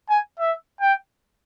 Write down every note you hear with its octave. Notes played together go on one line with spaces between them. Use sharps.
G#5
E5
G5